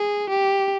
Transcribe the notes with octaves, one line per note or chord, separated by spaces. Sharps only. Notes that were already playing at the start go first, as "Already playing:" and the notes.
Already playing: G#4
G4